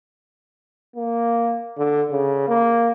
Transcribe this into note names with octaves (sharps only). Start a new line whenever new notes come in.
A#3
D3
C#3
A#3